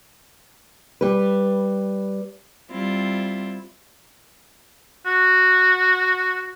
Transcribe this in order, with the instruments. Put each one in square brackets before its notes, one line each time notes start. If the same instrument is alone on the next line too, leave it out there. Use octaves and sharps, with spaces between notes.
[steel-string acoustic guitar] G3 B4
[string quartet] G3 C4 E4 F4
[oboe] F#4